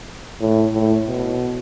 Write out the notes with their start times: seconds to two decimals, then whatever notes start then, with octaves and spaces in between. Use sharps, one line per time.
0.40 A2
0.73 A2
1.07 B2